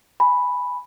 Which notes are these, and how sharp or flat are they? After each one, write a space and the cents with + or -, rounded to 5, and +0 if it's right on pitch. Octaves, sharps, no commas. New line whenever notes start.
G#5 +0 B5 +0